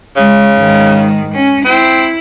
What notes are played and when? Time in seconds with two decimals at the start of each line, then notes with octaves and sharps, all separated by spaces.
0.16 C#3 G#3
0.56 G#2 D#3
1.33 C#4
1.65 C4 E4